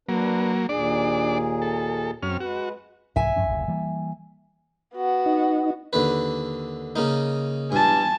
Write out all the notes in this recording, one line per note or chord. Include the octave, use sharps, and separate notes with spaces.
F#3 A#3 D4 B4
D#2 A#2 D4 G#4 D5
A4
F#2 C4 C#4 F6
G#3 F#4 B4
C2 G#2 E3 E5 G#5
G2 F3 C#4
F#1 D2 C3
E3 G3 A#3
B3 F#4
D#4
D#2 D3 B4
C#3 A#3 D#4
G2 G#5 A5